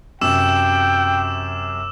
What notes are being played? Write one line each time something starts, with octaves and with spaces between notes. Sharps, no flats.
F#2 C3 G5 D6 E6 E7